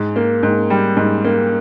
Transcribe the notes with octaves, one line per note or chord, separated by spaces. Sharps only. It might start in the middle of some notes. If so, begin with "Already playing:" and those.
Already playing: G#2
A#3
G#2
G3
G#2
A#3